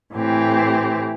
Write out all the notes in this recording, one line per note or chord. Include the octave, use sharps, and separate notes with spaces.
A2 E3 C4 G4